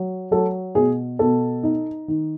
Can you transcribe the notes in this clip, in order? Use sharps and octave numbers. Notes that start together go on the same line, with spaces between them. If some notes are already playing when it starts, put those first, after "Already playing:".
Already playing: F#3
F#3 A4
B2 G#4
B2 A4
D#4
D#3